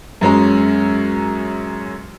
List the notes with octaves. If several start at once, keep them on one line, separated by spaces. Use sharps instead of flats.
F#2 G#3 C#4 A#5